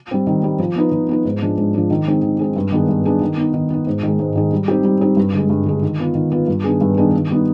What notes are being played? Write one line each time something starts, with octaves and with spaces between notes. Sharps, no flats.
G3 C4
D#3
G3 C4
F3
B3 D#4 B4
F3
B3 D#4 B4
G#2
F3 G#3 D4
G#2
F3 G#3 D4
D#3
G#3 C4 D#4
D#3
G#3 C4 D#4
G2
D#3 B3 D4 G#4
G2
D#3 B3 D4 G#4
D#3
B3 D#4
D#3
B3 D#4
G#2
D#3 G#3
G#2
D#3 G#3
G3
C4 D#4 G4
G3
C4 D#4 G4
G2
D3 G#3
G2
D3 G#3
D#3
B3 F4 B4
D#3
B3 F4 B4
G2
D#3 B3 D4 G#4
G2
D#3 B3 D4 G#4
D#3
G3 B3 D#4